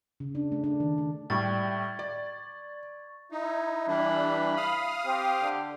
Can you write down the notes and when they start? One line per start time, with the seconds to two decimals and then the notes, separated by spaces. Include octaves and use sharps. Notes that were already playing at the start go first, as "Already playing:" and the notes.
0.20 C#3
0.35 D4
0.52 A3
0.64 D4
0.80 D#3
0.98 A3
1.30 A2 G3 C#6 G#6 A6
1.99 D5
3.32 D#4 E4
3.87 E3 G3 D4 B5
4.57 F5 D#6 F6
5.05 C4 G4
5.42 D3